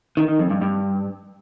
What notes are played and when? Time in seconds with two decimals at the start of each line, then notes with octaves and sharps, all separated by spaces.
0.17 D#3
0.28 D#3
0.39 F2
0.50 G2
0.61 G2